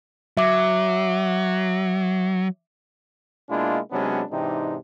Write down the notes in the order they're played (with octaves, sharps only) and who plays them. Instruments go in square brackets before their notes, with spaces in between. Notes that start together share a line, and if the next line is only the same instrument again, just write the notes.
[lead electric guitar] F#3 [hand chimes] E5 D6
[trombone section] B2 G#3 A#3 D4 E4 F4
C3 F#3 G#3 B3 C#4 D4
G#2 C3 E3 C4 D4 D#4